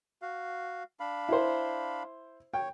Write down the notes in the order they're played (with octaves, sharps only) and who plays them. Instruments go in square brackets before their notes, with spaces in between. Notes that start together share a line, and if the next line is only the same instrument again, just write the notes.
[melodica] F#4 F5
D4 F5 B5
[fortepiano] E4 C5
[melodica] C#5 [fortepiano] G5